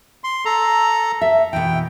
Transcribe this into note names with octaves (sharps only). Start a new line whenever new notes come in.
C6
A4 A#5
E5
B2 E3 G5